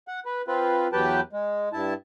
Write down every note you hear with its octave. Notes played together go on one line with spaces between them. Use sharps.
F#5
B4
C4 F4 B4
E2 F#3 G4 B4 G5 A5
G#3
G2 E4 A5